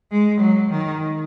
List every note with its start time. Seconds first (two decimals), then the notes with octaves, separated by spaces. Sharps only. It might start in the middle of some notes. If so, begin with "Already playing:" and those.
0.11 G#3
0.41 F#3
0.70 D#3